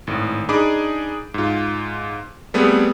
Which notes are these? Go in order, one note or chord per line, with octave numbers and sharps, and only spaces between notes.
G#1 A2
D4 D#4 G#4 B5 D6
G#2 F4
G3 A3 B3 C4 G#4